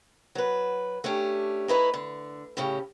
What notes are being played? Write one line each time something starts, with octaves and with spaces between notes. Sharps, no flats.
F#3 B4
A3 C#4 D4 G4
D#4 E4 B4 C#5
D3
A2 C#3 C#4 G4